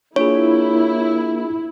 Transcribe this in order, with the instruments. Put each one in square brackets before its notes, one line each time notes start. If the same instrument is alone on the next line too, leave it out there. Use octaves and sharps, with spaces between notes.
[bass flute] A#3 [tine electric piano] D4 F4 G#4 [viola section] E4 [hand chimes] C#5